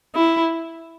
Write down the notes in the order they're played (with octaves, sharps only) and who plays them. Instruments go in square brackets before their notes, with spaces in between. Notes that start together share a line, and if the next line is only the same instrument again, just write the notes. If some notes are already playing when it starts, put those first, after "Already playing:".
[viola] E4